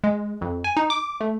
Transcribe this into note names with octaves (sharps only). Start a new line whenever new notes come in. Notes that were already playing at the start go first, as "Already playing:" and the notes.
G#3
F2
G#5
D#4
D6
A3